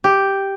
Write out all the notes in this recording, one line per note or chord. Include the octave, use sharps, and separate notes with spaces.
G4